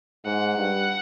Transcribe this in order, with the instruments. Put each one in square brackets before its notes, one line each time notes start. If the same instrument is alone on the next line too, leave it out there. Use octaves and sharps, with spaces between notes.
[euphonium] G#2 [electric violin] F#5
[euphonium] G2